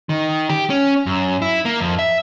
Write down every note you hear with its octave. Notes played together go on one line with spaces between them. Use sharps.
D#3
G4
C#4
F#2
E4
A#3
F2
E5